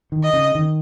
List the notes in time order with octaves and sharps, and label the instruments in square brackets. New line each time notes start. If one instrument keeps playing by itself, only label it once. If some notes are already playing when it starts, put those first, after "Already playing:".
[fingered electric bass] D#3
[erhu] D#5
[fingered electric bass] C#3
D#3